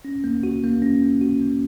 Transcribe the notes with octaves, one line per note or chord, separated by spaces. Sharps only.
C#4
A#3
F#4
A#3
C#4
A#3
F#4
A#3